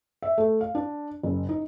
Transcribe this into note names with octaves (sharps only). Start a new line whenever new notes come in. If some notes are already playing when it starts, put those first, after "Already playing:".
E5
A3
F5
D4
F#1
D#4